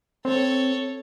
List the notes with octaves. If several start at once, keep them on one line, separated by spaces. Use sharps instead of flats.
C4 A4 C#5